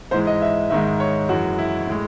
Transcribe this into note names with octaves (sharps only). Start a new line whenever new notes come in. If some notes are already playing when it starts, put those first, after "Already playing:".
G#2 E3 G#3 C5
D#5
E5
G#2 D#3 G#3 E5
C#5
F#2 E3 G#3 F#4
E4
A2 G#3